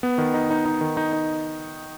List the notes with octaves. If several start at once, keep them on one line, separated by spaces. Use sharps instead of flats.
B3
D#3
D#4
D#4
D#4
D#3
D#4
D#4